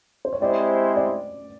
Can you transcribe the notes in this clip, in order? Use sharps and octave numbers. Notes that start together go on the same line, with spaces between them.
C5
C#5
G#3 C4 E4 G4 C5 D5
D5